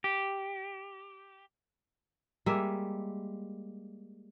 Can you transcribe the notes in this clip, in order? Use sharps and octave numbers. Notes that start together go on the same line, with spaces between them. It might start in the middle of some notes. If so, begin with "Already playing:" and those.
G4
G3 G#3 A#3 E5